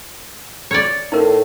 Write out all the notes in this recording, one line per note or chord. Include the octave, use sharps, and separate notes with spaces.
C#5 D5
A2 D#4 A#4